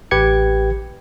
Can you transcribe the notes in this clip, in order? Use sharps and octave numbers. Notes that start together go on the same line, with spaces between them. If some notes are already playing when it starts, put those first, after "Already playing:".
A1 G4 B4 G5 G#6 C#7